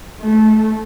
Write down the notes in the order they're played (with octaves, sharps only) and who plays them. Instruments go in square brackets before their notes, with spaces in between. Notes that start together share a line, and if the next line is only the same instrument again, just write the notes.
[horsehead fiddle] A3